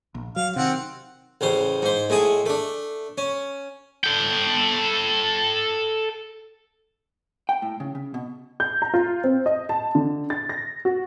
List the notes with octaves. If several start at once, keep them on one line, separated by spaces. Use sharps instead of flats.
A#1
F#3 F5
C3 D#3 C4 F#5
A1 C#3 C5
G#2 C5
A2 G#3 G#4 A5
A3 D4
C#4
A4 G5
G5
A2
C#3
C#3
B2
G6
A#5
F4
C4
D#5
A5
D3
A6
A#6
F#4